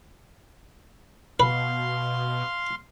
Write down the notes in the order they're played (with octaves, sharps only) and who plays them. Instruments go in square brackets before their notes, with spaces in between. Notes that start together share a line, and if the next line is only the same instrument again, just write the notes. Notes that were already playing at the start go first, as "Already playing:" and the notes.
[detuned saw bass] B2 [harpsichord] B4 [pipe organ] F5 C6